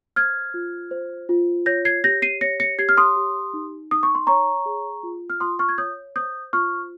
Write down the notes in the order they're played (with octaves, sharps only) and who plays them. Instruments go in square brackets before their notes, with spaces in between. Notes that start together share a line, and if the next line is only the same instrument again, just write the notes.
[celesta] C5 F6 G#6
F4
C5
F4
C#5 G6 A#6
G#6 C7
G4 G6 A#6
C7 D#7
C#5 A#6 C#7
A#6 C#7
G4 G#6 C7
F6
C6 D#6
G4
D#4
D#4 D#6
C#6
C6
C#5 A#5 C#6
G#4
F4
F6
F4 C6 D#6
C#6 F6
G#6
C#5 D#6 G6
C5 D#6 G6
F4 C#6 F6